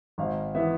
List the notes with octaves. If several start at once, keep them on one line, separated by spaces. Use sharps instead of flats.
G#1 F5
E3 B3 E5